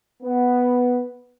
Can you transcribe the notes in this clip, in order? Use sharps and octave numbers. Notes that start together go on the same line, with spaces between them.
B3